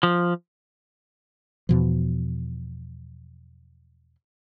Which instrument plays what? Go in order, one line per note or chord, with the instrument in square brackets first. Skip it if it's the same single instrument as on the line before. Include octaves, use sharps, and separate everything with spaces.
[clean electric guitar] F3
[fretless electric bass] E2 B2 F3